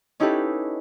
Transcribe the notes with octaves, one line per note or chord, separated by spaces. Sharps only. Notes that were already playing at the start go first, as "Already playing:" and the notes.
C#4 D#4 E4 G4 A4 B4